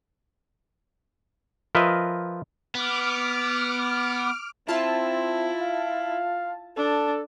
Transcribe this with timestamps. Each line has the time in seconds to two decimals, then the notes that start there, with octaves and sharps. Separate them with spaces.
1.75 F3 A#4 B4 D#5 E5
2.75 B3 D6 F6
4.68 C4 E4 F4 A5
5.61 F5
6.77 D4 A4